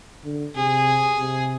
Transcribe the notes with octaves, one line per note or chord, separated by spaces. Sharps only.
D3
C3 G#4
C3